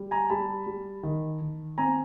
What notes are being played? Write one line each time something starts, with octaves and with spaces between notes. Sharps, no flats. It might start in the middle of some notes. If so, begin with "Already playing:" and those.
Already playing: G3
G#5 A#5
G3 A5 B5
G3
D#3
D#3
C4 G#5 A#5